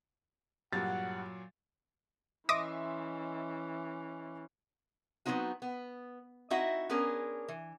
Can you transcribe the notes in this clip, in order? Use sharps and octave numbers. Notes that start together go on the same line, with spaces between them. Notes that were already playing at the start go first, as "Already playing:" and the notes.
G2 A#2 F#3 F#5 A6
E3 C#4 D#5 E5 C6 D6 D#6 A#6
F#3 G#3 B3 C4 D#4 F#4
B3
C4 D#4 E4 F#4 D#5 E5
B3 C#4 D4 G#4 A#4
E3